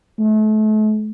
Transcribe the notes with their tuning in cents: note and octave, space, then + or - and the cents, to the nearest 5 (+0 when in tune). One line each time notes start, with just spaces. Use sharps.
A3 -35